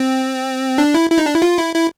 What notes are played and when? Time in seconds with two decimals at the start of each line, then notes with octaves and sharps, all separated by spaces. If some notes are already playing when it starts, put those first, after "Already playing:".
Already playing: C4
0.78 D4
0.94 E4
1.11 E4
1.18 D#4
1.26 D4
1.35 E4
1.42 F4
1.58 E4
1.75 E4